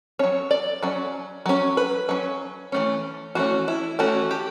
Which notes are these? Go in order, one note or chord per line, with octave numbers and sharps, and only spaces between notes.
F#3 C#4 C#5
D5
F#3 C#4
F#3 C#4
B4
F#3 C#4
E3 A3 C#4
E3 A3 C#4 F#4
E4
E3 A3 C#4 F#4
G4